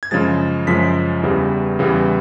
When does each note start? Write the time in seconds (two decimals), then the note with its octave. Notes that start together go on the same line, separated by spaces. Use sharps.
0.03 G#6
0.11 F#2 C#3 F3 G#3 A6
0.67 F#2 C#3 F3 G#3 B6
1.24 E2 C#3 E3 G3
1.79 E2 C#3 E3 G3